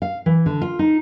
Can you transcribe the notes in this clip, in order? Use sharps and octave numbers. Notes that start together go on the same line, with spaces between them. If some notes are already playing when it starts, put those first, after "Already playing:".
F5
E3
D3
F4
D#4